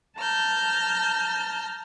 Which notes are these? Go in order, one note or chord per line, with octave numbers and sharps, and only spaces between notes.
A5 A#5 F6 G6